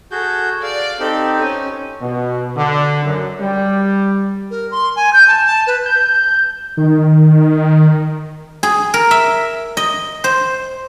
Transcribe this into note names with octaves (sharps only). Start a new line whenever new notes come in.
F#4 G#4 A4 G6
D5 F5
C4 D#4 G4 A4
C#4
B2
D3
F#2
G3
A#4
C6
G#5
G6
A5
A5
B4
G6
D#3
G#4
A#4
E5
D#5
C5